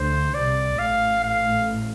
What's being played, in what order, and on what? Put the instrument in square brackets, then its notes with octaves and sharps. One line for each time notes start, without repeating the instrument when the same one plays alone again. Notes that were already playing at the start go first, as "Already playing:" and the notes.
Already playing: [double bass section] D2 D3 [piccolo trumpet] C5
[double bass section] C2 C3 [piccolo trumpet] D5
[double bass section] A1 A2 [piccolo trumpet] F5
[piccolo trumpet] F5